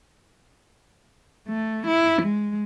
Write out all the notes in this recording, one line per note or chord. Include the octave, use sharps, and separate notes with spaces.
A3
E4
G#3